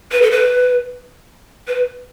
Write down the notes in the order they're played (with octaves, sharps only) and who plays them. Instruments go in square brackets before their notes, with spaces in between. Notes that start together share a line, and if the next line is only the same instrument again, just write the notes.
[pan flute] B4
A4
B4
B4